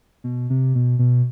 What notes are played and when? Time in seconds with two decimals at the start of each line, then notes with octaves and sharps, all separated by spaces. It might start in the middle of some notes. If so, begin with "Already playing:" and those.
0.24 B2
0.50 C3
0.75 B2
0.99 B2